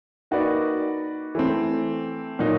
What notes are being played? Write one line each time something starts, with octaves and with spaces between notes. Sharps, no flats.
A#3 D#4 F#4 B4 D5
E3 A3 C4
A#2 F#3 A#3 D#4